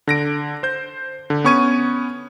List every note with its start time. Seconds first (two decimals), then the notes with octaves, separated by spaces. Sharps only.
0.07 D3 A#6 D7
0.63 C5 G6
1.30 D3
1.44 B3 C#4 C#6 G#6 D#7